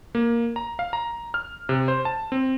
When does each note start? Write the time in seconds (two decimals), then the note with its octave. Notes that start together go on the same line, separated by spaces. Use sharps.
0.15 A#3
0.56 A#5
0.79 F5
0.93 A#5
1.34 F6
1.69 C3
1.88 C5
2.05 A5
2.32 C4